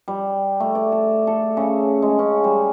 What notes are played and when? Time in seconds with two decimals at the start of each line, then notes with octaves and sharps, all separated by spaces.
0.08 G3
0.60 A3
0.75 D5
0.92 A4
1.27 A4
1.57 C#3
2.02 G#3
2.19 C#4
2.44 G3